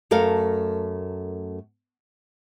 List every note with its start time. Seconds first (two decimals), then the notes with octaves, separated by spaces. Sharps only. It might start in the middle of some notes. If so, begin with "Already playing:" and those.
0.11 F#2 A3 A4 A#4 F5